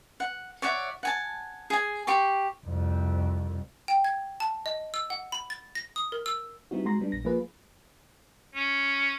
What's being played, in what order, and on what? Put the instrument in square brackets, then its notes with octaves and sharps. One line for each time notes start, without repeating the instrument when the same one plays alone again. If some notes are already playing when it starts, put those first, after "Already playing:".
[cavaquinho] F#5
C#5 D5 E5 F#5
F#5 G#5 A5
G#4 G#5
G4 G5 C6 C#6
[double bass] C2 F2
[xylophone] G5
G#6
A5
D#5
E6
F#5
B5
A6
A#6
D#6
A#4
E6
[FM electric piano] G3 B3 C4 D#4 E4 F#4
G#3 F#4 A#5 C6 A#6
G3 B3 D4
A#1 A#6
F3 A#3 F4 G#4 B4
[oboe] C#4